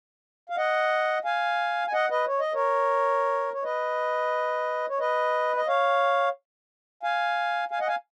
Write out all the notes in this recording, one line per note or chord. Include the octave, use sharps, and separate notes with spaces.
F5
D#5 F#5
F5 G#5
G#5
D#5 F#5
B4 D#5
C#5
D#5
A#4 C#5
C#5
B4 D#5
C#5
B4 D#5
D#5
C#5 F5
F5 G#5
F5 G#5
D#5 F#5
F5 G#5